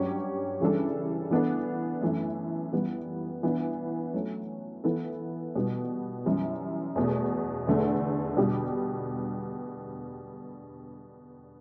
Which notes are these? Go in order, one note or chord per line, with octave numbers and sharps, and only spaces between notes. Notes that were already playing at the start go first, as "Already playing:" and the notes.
Already playing: G2 F#3 C#4 G4
C#3 E3 G3 D4 A4
E3 B3 D4 A4
F#2 E3 A3
E3 G3 B3
E3 B3 D4
F#3 A3 C#4
E3 B3 E4 A4
B2 G3 B3
F#2 E3 G3
E2 B2 A3
E2 D3 A3
B2 G3 D4 G4